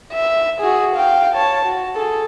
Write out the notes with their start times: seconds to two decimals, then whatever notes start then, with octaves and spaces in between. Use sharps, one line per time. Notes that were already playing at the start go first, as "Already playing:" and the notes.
0.13 E5
0.60 F#4 G#4
0.95 F5 G5
1.35 C#5 A5
1.66 F#4
1.95 G#4 A4